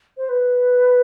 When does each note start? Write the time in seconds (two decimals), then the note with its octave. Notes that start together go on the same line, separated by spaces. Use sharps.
0.17 C5
0.29 B4